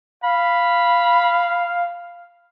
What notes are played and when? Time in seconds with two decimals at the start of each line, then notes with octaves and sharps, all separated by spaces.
0.23 F5 B5